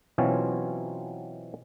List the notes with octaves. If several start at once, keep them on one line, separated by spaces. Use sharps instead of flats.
B2 E3 F#3 C4 C#4 F4